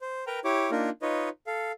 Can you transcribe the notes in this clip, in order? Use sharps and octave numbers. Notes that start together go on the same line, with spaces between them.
C5
A#4 B4 G5 A#5
E4 G4 C#5 D6
A#3 D4 D#4 F4 A#4
D#4 F4 B4 C#5 D#5
A4 F5